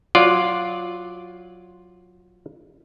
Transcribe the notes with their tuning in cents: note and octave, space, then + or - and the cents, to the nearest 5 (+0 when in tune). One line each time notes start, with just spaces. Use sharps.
F#3 -15 F4 +0 D5 +0